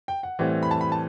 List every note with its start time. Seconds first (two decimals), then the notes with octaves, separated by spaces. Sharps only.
0.08 G5
0.23 F#5
0.39 A2 E3 G3 C4
0.63 B5
0.71 A5
0.81 B5
0.92 A5